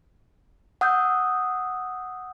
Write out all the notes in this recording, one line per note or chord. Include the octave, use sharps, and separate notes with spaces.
F#5 D#6 E6 G6